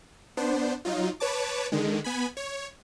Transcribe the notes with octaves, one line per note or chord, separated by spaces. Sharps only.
B3 D4 C5
F#3 D#4 F4
B4 C#5 A5 D6
D3 D#3 G#3
B3 G#5 B5
C#5